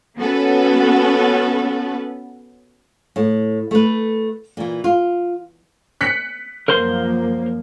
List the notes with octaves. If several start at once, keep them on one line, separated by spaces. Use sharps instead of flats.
B3 C#4 F#4 A4 B4
A2
A3 B4
A#2 E3
F4
F#6 B6 C#7
F#2 F3 A#3 A#4 C5 C6